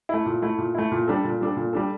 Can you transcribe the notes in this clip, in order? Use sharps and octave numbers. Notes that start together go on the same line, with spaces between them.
A3 E4
A#2
A3 E4
A#2
A3 E4
A#2
G3 D4 A4
A#2
G3 D4 A4
A#2
G3 D4 A4